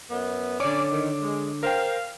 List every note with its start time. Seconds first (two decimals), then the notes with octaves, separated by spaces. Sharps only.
0.10 F#2 B3
0.60 D3 C#4 C#5 D5 D6
0.90 D#3
1.21 G#3
1.63 A#4 C5 F5 G5